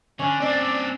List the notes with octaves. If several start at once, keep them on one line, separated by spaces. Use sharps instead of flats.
D3 C#4 F6
C4 D4 D5